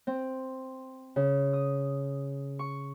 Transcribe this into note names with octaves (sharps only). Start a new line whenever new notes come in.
C4
C#3
D#6
C#6